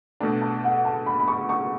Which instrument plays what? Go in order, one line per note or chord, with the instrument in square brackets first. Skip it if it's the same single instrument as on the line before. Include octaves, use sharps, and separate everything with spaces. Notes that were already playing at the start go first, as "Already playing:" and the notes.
[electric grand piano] B2 A3 D4 [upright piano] A5
[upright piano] A5
F#5
A5
B5
B5
C#6
C#6